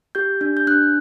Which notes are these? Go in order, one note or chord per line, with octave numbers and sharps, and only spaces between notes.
G4 G6
D4
G6
D4 F#6